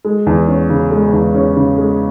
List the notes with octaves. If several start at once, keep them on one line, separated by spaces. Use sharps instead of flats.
G#3
E2
C#4
C#3
G#3
E2
C#4
C#3
G#3